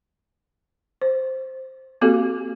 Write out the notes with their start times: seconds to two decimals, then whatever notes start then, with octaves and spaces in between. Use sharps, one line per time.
1.01 C5
2.01 A#3 C4 F#4 G4 A4 F5